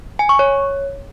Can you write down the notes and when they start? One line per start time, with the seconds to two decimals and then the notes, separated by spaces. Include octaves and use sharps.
0.19 G#5
0.29 C#6
0.39 C#5